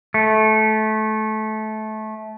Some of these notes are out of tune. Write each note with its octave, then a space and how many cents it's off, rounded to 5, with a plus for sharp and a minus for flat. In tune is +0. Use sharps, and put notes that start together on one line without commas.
A3 -20